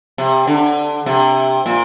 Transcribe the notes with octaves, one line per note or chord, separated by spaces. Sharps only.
C3
D3
C3
A#2